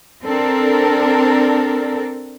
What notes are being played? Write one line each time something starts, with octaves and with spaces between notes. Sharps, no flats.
C4 D4 A4 A#4